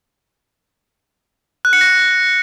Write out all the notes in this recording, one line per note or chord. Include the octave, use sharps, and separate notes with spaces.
F#6
C#7
A#6